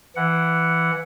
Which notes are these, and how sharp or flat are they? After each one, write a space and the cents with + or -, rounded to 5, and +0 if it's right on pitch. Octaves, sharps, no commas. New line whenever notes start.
E3 +10 F#5 +0